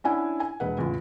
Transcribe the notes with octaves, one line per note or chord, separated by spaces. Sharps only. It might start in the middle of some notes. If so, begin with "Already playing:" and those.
C#4 D4 E4 F#5 G#5
G#5
E1 B4 F#5
E2 A2 C#3 F4